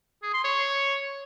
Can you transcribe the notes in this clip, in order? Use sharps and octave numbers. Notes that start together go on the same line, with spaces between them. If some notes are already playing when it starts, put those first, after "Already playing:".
G#4
C6
C#5